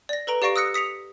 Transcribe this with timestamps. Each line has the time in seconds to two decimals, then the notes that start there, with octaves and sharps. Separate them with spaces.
0.09 D5 A#6
0.27 A4 B4 A#5 D7
0.42 G4 D5 F5 C#6 A#6 D7
0.56 D#6 E6 F#6 A#6 C#7
0.74 D#6 B6 C#7 F7